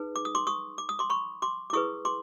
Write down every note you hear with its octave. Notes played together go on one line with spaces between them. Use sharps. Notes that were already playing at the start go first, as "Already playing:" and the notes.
Already playing: D#4 G#4 B4
D6
D#6
C6 D6
C#6 D#6
D6
D#6
C6 D6
B5 C#6
C6 D6
D6
E4 G#4 B4 C#6 D#6
C6 D6